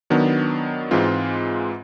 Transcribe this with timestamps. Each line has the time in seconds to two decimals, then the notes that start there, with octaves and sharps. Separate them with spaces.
0.10 D#3 F#3 B3 D4
0.91 G#2 E3 G#3 C4 F4